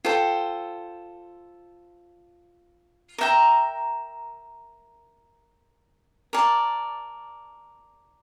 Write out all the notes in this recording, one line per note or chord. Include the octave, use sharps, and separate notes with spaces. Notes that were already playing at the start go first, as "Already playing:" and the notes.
F4 A4 C5 G5
A#4 E5 G5 A#5
A#4 D5 A5